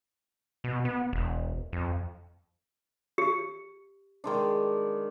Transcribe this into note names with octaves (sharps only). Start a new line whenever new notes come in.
B2
B3
E1
F2
G4
D#3 G#3 D4